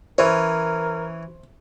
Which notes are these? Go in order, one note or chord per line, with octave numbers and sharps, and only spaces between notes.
E3 C#4 A#4 C5